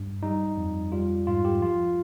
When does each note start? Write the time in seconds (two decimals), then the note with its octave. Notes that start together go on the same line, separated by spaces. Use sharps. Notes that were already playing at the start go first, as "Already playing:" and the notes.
Already playing: G2
0.23 G3 D#4
0.58 F2
0.92 G3 F4
1.27 G#2 F4
1.45 G4
1.61 F3 F4